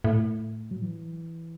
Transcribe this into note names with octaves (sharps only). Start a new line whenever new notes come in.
A2
F#3
E3